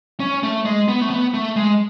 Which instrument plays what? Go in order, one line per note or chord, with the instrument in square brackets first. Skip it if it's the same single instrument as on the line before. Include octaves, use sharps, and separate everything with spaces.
[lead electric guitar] C#4
A3
G#3
B3
A3
B3
A3
G#3